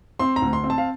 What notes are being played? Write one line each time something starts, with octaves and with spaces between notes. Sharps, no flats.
C4 C6
A#5
D2
C6
C4
A5
F5